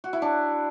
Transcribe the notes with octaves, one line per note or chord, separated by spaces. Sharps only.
F#4
E4
D4